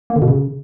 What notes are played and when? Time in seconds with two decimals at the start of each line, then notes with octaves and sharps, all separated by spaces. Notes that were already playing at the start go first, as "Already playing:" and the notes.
0.10 A#3
0.16 D3
0.22 B2
0.28 C#3